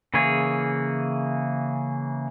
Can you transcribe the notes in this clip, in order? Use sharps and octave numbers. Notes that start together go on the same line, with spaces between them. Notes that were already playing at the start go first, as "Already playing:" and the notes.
C#3 E3 A#3 G#4 C#5